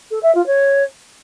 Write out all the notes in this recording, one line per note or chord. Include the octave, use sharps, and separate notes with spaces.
A4
E5
F4
C#5